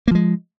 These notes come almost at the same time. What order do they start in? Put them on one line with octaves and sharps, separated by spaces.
A#3 F3 G#3